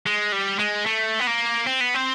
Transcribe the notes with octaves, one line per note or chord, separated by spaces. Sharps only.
G#3
G3
G#3
A3
B3
A#3
C4
B3
C4